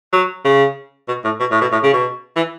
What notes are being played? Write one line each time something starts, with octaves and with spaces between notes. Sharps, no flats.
F#3
C#3
B2
A2
B2
A2
B2
A2
C#3
B2
E3